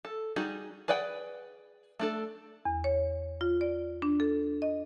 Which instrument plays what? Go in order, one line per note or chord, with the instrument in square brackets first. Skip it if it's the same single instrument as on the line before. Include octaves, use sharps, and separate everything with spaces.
[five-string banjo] A4
G3 D#4 F#4 G#4
G#4 B4 D5 F#5 G5
A3 D4 A4
[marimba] E2
C#5
F4
D5
D4
A4
D#5